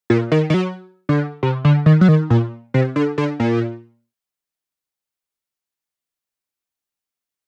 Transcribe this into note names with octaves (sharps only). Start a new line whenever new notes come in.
A#2
D#3
D#3
F#3
D3
C3
D3
D#3
F#3
D#3
A#2
C3
D3
D3
A#2